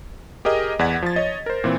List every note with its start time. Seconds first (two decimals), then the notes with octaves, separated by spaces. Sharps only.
0.45 G4 G#4 A#4 D#5
0.79 E2 D5 F#5 G#6 B6
1.02 F3 A6
1.16 C#5 D#5
1.46 A#4 C5
1.64 A#2 E3 C4